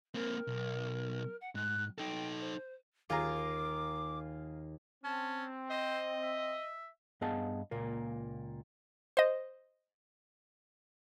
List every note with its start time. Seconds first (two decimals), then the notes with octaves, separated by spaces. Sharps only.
0.14 A#3 C4 A#4
0.47 B1
1.41 F#5
1.55 G#2 F#6
1.98 D#4 A4 G5
2.40 C5
3.10 D#2 F4 G#4 A#5 D6
5.04 C4 C#4 A5
5.70 C5 D#5
6.23 E5
7.21 G2 B3 G#4 D#5 F5 A5
7.71 C#2 A#2 A#3
9.17 C5 D#5